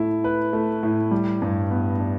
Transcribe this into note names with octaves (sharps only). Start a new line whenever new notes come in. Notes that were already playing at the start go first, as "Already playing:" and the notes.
Already playing: A2 A3 E4
B4
A3
A2
G3
G2
B3
D4